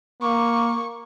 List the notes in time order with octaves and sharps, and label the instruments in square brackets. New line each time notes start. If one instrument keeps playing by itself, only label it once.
[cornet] A#3 [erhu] C#6